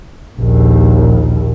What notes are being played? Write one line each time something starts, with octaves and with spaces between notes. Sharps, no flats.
A#1 D#2